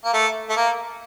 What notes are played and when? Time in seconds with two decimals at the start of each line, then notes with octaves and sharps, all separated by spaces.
0.05 A#3
0.14 A3
0.49 A3
0.56 A#3